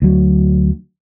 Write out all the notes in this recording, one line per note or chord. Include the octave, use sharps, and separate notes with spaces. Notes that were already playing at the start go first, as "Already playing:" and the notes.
D2 F#3